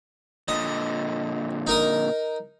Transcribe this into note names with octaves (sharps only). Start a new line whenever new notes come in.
A#2 D3 D#5
D#4 A#4 D#6